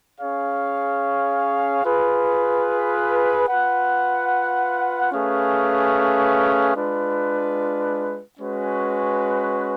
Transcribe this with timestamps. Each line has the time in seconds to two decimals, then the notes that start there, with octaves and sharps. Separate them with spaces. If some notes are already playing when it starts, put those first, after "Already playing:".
0.19 C#4 G#4 C#5 F5
1.84 F4 G#4 B4
3.48 F4 B4 F#5
5.12 A3 C#4 G#4 B4 F5
6.75 G#3 D4 F4 B4
8.39 G#3 C#4 F#4 B4